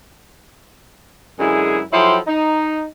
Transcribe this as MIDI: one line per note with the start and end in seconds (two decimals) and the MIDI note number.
1.39 1.81 42
1.39 1.81 50
1.39 1.81 56
1.39 1.81 64
1.39 1.81 68
1.92 2.18 53
1.92 2.18 54
1.92 2.18 64
1.92 2.18 69
1.92 2.18 79
1.92 2.18 84
2.27 2.86 63